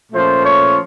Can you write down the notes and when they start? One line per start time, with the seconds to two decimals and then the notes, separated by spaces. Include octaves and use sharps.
0.12 A#2 F3 A3 C#4 F4 C5
0.43 C#5